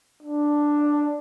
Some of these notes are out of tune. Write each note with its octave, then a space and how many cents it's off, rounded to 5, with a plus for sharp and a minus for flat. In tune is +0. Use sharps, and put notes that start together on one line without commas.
D4 +5